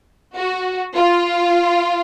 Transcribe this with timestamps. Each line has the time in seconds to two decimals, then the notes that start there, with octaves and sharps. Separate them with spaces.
0.35 F#4
0.95 F4